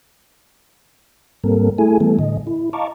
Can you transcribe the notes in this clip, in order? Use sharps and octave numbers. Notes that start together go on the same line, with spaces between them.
G#2 G3 A#3 C4 A4 A#4
A3 E4 G#4 A4 G#5
E3 G3 A3 B3 A4
A2 D3 D#5
E4
D#5 F5 A5 A#5 C#6 D6